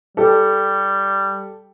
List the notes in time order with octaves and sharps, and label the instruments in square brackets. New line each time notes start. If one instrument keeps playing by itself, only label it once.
[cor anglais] G3 [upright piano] G4 A4